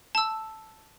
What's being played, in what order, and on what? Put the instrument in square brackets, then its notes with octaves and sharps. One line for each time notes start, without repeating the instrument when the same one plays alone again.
[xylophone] A5 E6